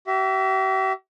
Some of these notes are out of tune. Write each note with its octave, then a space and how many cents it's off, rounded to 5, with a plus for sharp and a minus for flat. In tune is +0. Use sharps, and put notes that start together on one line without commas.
G4 -45 E5 +20